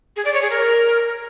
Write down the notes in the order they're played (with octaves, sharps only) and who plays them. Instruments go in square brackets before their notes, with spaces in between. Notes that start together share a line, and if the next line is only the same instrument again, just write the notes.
[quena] G#4
D5
C#5
G#4
A#4